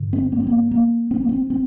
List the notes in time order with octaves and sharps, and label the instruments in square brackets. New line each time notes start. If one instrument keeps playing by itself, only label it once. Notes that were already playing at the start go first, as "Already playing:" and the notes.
Already playing: [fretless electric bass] G2 D3
C4
A#3
C4
A#3
A#3
C4
A#3
C4
C4